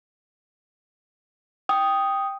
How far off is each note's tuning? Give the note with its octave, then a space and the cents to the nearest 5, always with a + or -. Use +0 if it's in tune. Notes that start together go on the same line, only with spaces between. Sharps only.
G5 +0 D#6 +0